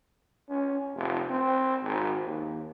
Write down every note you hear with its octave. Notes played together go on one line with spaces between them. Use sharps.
C#4
F1
C4
G#1
D#2